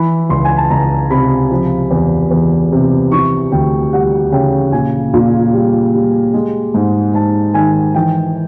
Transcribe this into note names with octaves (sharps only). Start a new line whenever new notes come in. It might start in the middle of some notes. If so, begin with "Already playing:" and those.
Already playing: E3 B5
C#2 C6
G#5
A5
C#2 A#5
C3 B5
F3
E2
E2
C3
E3 C#6
D2 G5
G3 F#5
C#3 G5
A#2 G#5
A#2
G3
G3
G#3
G#2
G#2 A5
D#3 G#5
E3 G5